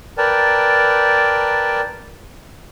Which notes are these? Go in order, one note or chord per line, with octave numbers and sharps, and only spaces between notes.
A#4 B4 D5 G5 A5